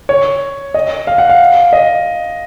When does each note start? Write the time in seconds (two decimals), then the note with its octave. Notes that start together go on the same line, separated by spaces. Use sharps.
0.09 C#5
0.74 D#5
1.07 F5
1.18 F#5
1.29 F5
1.73 D#5